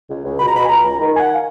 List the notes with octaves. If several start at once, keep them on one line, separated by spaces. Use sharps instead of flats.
C#2
C#2
B2 B5
A#5
B2 B5
G#5
C#2 A#5
C#2
D#3
D#3 G#5
F#5
F5